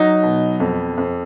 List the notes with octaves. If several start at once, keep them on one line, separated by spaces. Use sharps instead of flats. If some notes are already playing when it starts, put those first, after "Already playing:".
Already playing: F#3 D#4
B2
F2
F2